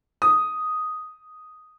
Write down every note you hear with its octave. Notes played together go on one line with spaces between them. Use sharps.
D#6